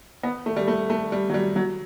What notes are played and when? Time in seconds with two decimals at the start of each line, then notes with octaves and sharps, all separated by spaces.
0.23 B3
0.46 A3
0.56 G3
0.68 A3
0.90 A3
1.12 G3
1.30 F#3
1.34 G3
1.56 F#3